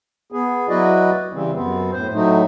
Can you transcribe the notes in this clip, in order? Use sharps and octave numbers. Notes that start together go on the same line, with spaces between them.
B3 G#4
F#3 E4 F#4 B4 D5 D#5
C#3 E3 G3 C4
F#2 B3 C4
A2 C5
A2 F#3 A3 D#4